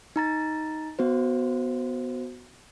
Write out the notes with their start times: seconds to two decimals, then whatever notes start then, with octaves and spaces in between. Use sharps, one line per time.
0.16 D#4 A#5 A6
0.99 B3 F#4 C5